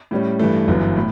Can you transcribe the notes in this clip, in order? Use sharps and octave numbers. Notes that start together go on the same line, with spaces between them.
A2 G3 C#4
G2 E3 A3
G1 F#2 E3
A2